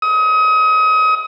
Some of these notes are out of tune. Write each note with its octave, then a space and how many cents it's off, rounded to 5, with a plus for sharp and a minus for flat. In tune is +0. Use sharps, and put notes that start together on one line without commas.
D#6 +30